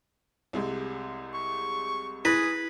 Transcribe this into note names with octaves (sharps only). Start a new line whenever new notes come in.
C2 C3 G#3
C#6
E4 G#4 B4